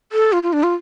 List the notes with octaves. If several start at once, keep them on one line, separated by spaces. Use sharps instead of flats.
A4
F4
F4
D4
F4